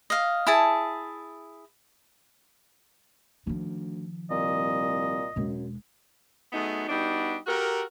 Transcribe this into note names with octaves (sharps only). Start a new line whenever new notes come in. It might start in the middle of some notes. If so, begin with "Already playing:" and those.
D#5 F5
E4 G#4 A5
D2 D#3 F3
C2 A#2 D#5
E1 F#2 G#3
F#3 A3 B3 D#4 G#4
G3 B3 D4 D#4 F#4
F#4 G4 A4 A#4